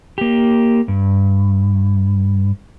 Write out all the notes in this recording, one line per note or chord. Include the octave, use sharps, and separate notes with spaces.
A#3 G4
G2